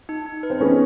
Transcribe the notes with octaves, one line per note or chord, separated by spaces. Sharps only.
D#4
D#4
B4
C4
A3 B3 C#4